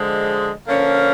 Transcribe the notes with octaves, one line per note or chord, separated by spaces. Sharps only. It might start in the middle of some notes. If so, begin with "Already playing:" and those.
Already playing: D3 F3 G#3
D3 F3 A#3 C#4